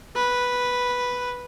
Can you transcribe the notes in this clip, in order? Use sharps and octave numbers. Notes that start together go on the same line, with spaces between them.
B4